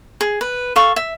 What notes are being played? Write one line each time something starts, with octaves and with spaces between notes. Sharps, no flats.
G#4
B4
A4 F5 C#6
E5